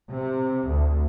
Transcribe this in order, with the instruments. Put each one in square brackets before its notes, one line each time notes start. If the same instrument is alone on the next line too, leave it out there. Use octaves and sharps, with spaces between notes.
[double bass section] C3
D2